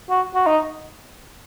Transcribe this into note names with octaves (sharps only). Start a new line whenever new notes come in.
F#4
F#4
D#4